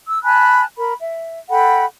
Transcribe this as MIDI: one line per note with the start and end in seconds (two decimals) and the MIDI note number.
0.08 0.22 88
0.23 0.64 80
0.23 0.64 81
0.23 0.64 83
0.23 0.64 90
0.78 0.93 70
0.78 0.93 83
1.00 1.39 76
1.50 1.85 69
1.50 1.85 78
1.50 1.85 79
1.50 1.85 83